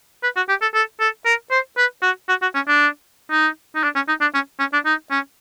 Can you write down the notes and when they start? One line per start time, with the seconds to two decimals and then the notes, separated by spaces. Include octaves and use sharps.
0.23 B4
0.36 F#4
0.49 G4
0.62 A4
0.74 A4
1.00 A4
1.26 A#4
1.51 C5
1.77 B4
2.02 F#4
2.29 F#4
2.42 F#4
2.55 C#4
2.68 D4
3.31 D#4
3.75 D#4
3.83 D4
3.95 C#4
4.08 D#4
4.21 D4
4.34 C#4
4.59 C#4
4.73 D4
4.86 D#4
5.11 C#4